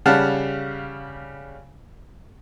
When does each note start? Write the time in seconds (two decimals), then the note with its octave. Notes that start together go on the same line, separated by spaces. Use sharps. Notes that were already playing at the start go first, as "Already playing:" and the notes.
0.06 C#3 G3 F5 F#5 A5